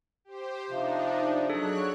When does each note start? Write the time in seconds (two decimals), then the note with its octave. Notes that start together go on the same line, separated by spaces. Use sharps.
0.25 G4 C5
0.70 C3 F3 D4 D#4
1.50 F#3 D4 G#4 A4 C#5 F#6